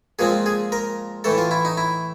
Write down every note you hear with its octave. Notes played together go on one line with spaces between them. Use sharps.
A#2 F3 G#3 C4 G#4
G#4
A#4
A2 E3 A3 A4
F4
E4
D#4
E4